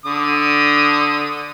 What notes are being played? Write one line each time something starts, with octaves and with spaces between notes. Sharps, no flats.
D3 D#6